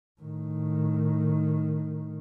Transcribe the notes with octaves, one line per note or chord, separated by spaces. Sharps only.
A2 D#3